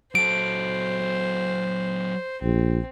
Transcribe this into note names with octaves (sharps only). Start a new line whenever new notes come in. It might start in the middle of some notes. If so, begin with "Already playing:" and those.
F#3 A4 C5 D7
A#1 C4